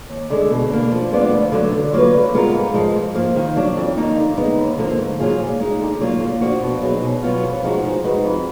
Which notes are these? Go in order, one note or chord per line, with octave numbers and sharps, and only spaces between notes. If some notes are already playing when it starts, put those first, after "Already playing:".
D#2
D3 G#3
B2
A#3 D4
F3
G#3 B3 D4 F4
D2
D3 F#3
D3
F#3 A#3 F4 B4
D3
G#3 B3 F4 A#4
G#2
F3 G#3
G#2
F3 A#3 F4
D#3
F#3 D4
F2
D#3 A#3 D#4
D3
G#3 B3 D#4
D#2
D3 F3 A#3
G#2
F#3 A#3 F4 G#4
A#2
G#3 D#4
D3
F#3 A#3 D4 F4
A#2
F3 A#3 D4 F#4
B2
F#3 B3 D#4 G#4
B2
F#3 B3 F4
F2
F3 G#3 D#4 F#4
F3
G#3 D#4 F#4 B4
F2